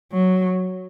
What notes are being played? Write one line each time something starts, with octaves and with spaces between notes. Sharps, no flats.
F#3